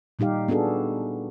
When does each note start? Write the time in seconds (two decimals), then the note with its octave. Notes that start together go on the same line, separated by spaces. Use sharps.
0.19 A#2 G3 D#4 G4 F5
0.48 B3 D4 F#4 G#4 A4